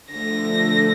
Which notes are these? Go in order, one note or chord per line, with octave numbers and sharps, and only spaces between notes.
D3 F3 A3 A#6